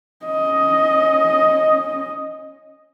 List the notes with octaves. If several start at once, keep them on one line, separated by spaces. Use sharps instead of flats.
C#4 D#5